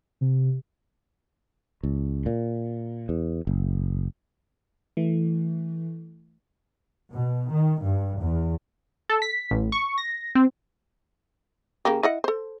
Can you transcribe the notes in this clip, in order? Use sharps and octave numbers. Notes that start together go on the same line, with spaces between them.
C3
C#2
A#2
E2
F#1
E3 A3
B2
D#3
G2
E2
A4
B6
A1
C#6
A#6
C4
C#3 A#3 G4
E4 D#5 F#5
A4 C5